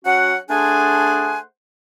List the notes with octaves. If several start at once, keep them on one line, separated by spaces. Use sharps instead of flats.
F#3 C#4 F#4 F#5
A3 D4 G#4 C5 F#5 G#5